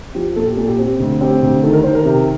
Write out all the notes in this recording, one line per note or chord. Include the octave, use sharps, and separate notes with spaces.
F3 G4
A#2 A4
G4
A#2 A4
G4
C4 G4
D2
C4 G4
D2 G4
D#3 A4
A#4
D#3 C5
A#4
C3